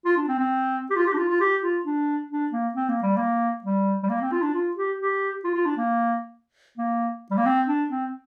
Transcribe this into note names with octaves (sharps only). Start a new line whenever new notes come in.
F4
D4
C4
C4
G4
F4
G4
D4
F4
F4
G4
F4
D4
D4
A#3
C4
A#3
G3
A#3
G3
G3
A#3
C4
F4
D4
F4
G4
G4
F4
F4
D4
A#3
A#3
G3
A#3
C4
D4
C4